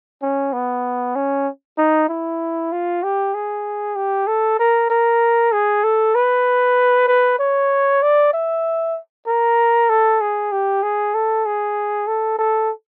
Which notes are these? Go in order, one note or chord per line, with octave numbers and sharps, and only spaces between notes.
C#4
B3
C#4
D#4
E4
F4
G4
G#4
G4
A4
A#4
A#4
G#4
A4
B4
B4
C#5
D5
E5
A#4
A4
G#4
G4
G#4
A4
G#4
A4
A4